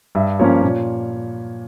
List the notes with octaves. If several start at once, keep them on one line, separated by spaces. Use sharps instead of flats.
G2 E5
F3 A#3 C#4 C#5
A#2